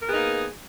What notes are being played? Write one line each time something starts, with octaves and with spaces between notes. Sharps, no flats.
A#3 B3 D#4 G#4 A#4